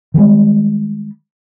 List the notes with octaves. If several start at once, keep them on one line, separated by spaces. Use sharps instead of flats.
D#3 E3 G3 G#3